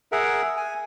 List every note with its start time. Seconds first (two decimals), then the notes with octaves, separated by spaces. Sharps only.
0.12 G#4 A#4 E5 F#5
0.57 G#5